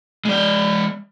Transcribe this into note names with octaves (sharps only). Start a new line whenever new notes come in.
G#3 D5